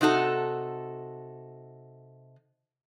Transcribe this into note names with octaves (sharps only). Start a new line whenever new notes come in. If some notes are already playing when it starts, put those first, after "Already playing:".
C3 D#4 F#4 A4